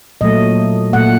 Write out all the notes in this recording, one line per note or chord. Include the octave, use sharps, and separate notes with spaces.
A#2 F#3 A3 D#5
A#2 A3 F#5